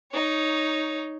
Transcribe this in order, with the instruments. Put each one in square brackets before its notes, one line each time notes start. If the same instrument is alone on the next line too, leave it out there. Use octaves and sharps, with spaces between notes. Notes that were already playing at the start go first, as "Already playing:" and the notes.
[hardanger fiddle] D#4 C#5